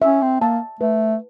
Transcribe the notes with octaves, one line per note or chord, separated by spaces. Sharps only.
C#4 E5
C4
A#3 A5
A3 B4